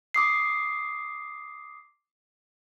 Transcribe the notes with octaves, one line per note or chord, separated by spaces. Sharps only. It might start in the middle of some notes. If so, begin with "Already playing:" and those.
D6 D#6 C7